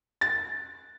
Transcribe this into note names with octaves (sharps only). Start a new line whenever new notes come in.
A6